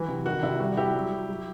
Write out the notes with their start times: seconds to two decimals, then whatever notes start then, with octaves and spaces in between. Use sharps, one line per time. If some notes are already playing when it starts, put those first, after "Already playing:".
Already playing: E3 F#3 F#4
0.08 C3
0.25 D#3 F#4
0.43 C3 E4
0.60 G3 F#4
0.77 G3 E4 G4
0.94 F#3
1.11 F#3
1.29 F#3